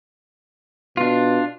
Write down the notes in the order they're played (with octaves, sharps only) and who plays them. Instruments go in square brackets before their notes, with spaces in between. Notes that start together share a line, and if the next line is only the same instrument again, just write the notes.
[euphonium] B2 [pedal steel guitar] D4 F4